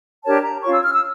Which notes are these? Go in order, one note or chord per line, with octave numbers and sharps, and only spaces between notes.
D4 G4 A#4 C#5 A5
A#5
C#4 F4 C#5 C#6
E6
F6
E6